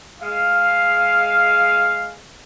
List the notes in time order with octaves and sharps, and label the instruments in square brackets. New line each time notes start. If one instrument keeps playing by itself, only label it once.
[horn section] G#3 F5